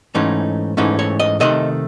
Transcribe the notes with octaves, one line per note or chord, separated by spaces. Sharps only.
G#2 E3 A3 C#4 D#4
G#2 E3 A3 C#4 D#4
C#5
D#5
C3 D#3 A3 D#5